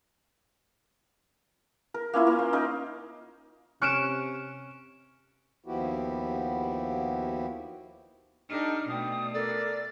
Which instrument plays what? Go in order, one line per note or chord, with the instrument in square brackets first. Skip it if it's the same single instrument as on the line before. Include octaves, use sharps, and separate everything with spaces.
[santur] A#4
A#3 C#4 E4 F4
A#3
C5
C#4 D#4 A#4
[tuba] C3 [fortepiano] C#4 F6 F#6 [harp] C#6 D7 E7
[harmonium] D#2 F3 B3 E4 F#4 G4
[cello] D4 D#4 [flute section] G4 A4 D#5 [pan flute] F6
[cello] B2 A3 [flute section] D5 G5 [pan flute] D#6
[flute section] D4 A#4 [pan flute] A4 [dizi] D5